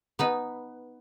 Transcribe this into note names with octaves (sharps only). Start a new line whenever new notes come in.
B3 D#4 B4